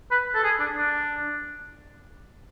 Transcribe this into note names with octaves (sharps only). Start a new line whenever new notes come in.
B4
A4
G#4
D4
D4